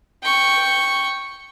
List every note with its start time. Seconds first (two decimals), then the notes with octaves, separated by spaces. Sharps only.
0.23 G5 C#6